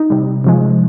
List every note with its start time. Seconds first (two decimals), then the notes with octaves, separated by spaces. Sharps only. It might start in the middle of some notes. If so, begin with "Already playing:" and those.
Already playing: D#4
0.10 C3 G3
0.44 C3 F3 G#3